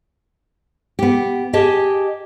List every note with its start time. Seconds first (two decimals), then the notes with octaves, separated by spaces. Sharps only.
0.99 B3 G4
1.53 G4 G#4 D#5 A5